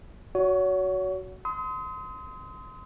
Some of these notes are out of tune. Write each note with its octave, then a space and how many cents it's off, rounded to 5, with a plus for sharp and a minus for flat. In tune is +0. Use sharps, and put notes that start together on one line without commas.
F#4 +0 C#5 +30
C6 -25 D#6 +35